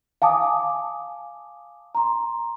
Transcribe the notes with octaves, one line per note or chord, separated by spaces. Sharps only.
F5 G#5 A5 D6 D#6
A#5 C6